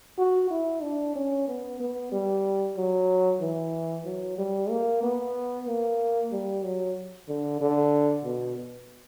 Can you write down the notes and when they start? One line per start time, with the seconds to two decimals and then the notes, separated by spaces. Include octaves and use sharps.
0.18 F#4
0.50 E4
0.82 D4
1.15 C#4
1.48 B3
1.80 B3
2.12 G3
2.77 F#3
3.41 E3
4.05 F#3
4.38 G3
4.70 A#3
5.03 B3
5.67 A#3
6.32 G3
6.64 F#3
7.28 D3
7.61 D3
8.25 B2